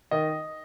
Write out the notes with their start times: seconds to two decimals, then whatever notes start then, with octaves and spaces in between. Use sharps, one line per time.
0.11 D#3 D#5